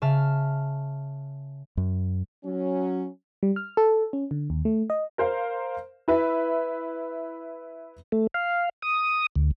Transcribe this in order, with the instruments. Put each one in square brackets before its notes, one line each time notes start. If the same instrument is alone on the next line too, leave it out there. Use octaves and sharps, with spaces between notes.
[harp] C#3 E5 A5 F6
[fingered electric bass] F#2
[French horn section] F#3 C#4
[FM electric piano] G3
F6
A4
C#4
D3
D#2
A3
D#5
[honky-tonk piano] A#4 C5 F5
E4 B4 E5
[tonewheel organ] A3
F5
D#6
D2